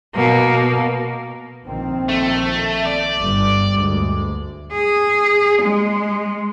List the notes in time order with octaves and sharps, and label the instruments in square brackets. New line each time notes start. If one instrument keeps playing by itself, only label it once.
[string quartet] B2 A#3
[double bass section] A#1 D#3 C4
[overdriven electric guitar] A3
D5
[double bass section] G1 G2
D2 G#3
[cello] G#4
G#3